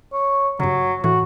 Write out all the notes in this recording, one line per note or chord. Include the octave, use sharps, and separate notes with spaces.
C#5
G2 C#3 F#3
A2 E3 F#4